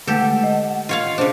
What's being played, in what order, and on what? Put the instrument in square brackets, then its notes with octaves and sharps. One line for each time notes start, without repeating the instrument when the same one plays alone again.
[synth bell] D3 G#3 A3 [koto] G4 A4 [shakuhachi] F#5
[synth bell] D#5
[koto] F4 C#5 F5
[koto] C#3 D4 [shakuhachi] C5